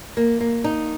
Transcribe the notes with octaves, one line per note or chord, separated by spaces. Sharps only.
A#3
A#3
D#4